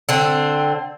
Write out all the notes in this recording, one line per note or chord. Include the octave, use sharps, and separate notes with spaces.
D3 C4